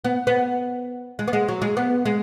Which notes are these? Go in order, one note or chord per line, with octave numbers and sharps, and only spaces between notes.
B3
B3
G#3
B3
G#3
F#3
G#3
B3
G#3